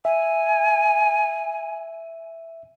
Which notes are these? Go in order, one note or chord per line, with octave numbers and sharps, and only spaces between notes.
E5 G#5